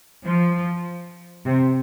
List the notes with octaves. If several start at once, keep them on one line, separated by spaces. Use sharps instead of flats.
F3
C3